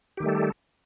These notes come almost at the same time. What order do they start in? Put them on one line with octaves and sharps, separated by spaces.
G4 D#3 A3 G3 A4